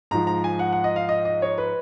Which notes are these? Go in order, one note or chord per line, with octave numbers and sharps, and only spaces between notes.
G#2 F3 A#5
A#5
G#5
F#5
F#5
D#5
F5
D#5
D#5
C#5
B4